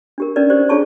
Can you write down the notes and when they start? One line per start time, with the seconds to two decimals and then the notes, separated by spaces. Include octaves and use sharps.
0.18 D4 G4 A#4
0.36 C#4 D#4 A#4 B4 D5
0.50 G4 C5 D5
0.69 D4 F4 G#4 C#5 A5 C#6